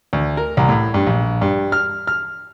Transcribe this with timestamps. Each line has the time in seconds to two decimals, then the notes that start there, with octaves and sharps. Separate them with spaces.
0.13 D2
0.37 A#4
0.57 C2
0.69 A2
0.94 G2
1.07 A#1
1.41 G2
1.72 F6
2.07 F6